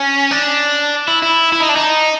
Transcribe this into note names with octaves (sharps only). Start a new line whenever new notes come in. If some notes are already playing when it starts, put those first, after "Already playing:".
Already playing: C#4
D4
E4
E4
E4
D#4
D4
D#4